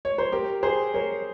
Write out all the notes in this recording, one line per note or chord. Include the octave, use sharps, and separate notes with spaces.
C#5
C5
G4 A#4
G#4 C5
A#4 C#5